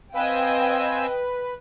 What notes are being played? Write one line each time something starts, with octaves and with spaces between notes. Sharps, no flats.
C4 B4 D#5 F5 G5 G#5 E6